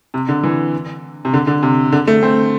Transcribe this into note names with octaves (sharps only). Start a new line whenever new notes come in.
C3
D3
E3
C3
D3
D3
C3
D3
A3
C4